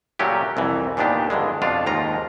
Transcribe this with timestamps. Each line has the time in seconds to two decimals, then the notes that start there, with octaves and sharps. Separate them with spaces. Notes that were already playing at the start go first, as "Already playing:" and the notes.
0.19 A#2 C#3 F#3 A3 C#4 G4
0.57 C2 F2 E3
0.97 D#2 A#2 D#3 B3 D4 G4
1.30 C#2 G2 D3 G#3
1.62 F2 B2 D4 F4 F5
1.86 D#2 G#2 F4 A#5